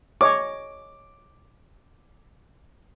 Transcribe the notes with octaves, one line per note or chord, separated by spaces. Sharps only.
G#4 C#5 D#5 D6